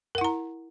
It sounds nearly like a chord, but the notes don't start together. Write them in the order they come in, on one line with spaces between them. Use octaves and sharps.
A#4 F#5 E4 A#5